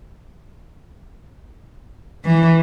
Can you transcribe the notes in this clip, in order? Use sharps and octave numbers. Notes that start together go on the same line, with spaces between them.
E3